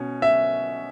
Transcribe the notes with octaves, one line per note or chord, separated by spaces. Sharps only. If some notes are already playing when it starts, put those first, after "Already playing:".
Already playing: B2 C#4
E5